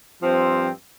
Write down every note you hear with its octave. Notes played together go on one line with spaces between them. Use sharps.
G2 F3 C4